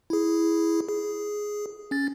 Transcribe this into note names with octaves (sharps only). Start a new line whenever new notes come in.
E4 G#4
G#4
C#4 A6